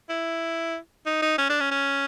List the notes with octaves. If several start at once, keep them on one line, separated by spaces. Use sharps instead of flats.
E4
D#4
D#4
C#4
D4
C#4
C#4